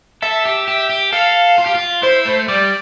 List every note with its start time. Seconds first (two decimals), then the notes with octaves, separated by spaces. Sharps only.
0.22 A4 E5
0.45 G4
0.68 G4
0.90 G4
1.12 A4 F5
1.58 F4
1.66 G4
1.74 F4
2.03 E4 C5
2.25 A3
2.48 G3 D5